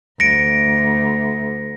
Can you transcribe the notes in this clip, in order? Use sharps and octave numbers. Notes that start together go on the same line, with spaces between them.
D2 A#6 C#7 D7